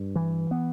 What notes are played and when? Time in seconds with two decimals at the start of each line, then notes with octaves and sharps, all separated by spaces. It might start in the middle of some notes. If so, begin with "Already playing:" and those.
Already playing: G2
0.16 E3
0.51 B3